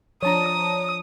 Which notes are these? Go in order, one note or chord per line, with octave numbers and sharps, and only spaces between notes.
F3 D4 C#5 A5 A#5 D#6